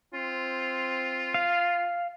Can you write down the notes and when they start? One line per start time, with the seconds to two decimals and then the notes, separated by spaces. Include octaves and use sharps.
0.14 C4 F4
1.34 F5